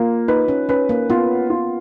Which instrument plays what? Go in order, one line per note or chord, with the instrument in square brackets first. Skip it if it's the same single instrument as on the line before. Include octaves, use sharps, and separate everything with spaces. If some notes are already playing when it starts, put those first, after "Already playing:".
Already playing: [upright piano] A#3 [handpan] F4
[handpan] D#4 [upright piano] B4
[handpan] C#4
[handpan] C#4 [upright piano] B4
[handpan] A#3
[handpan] B3 [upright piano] F4
[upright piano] F4